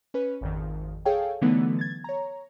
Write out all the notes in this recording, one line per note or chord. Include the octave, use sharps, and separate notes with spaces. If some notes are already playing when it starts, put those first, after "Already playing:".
C#4 B4
G#1 F2 D#3
G#4 A4 C#5 F5 G5
D3 E3 F#3 A3 B3 D#4
G#6 A6
C#5 A#5